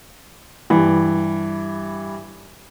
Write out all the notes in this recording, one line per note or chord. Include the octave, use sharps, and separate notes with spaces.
G2 E3